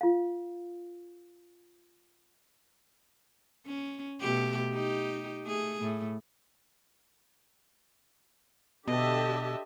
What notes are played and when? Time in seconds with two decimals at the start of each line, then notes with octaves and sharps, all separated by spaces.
0.01 F4 F5
3.67 C#4
4.21 B2 A3 G4
4.73 D#4 G4
5.44 A3 G#4
5.80 A2 A3
8.88 B2 D3 G4 D#5 E5 A5